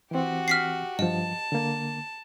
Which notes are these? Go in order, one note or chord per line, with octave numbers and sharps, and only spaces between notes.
E3 C4 F#4 G4
F6 B6 C7
G2 F3 D#5 A5
D3 A#3